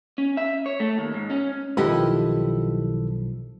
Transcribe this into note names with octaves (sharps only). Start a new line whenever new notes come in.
C#4
E5
C#5
A3
D#2
G#2
C#4
B1 D#3 F3 E4 G4 A4 B4 D#5